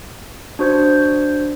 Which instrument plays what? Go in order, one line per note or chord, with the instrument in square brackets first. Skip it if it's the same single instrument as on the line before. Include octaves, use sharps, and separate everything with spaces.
[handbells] D4 F#4 C5 G6 G#6